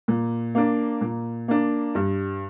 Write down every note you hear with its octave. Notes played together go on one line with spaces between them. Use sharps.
A#2
A#3 D4
A#2
A#3 D4
G2